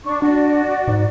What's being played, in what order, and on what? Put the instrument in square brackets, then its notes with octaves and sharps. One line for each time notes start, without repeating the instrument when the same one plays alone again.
[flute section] D4 C#6
[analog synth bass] D4 [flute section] F#4 D5
[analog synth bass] G#2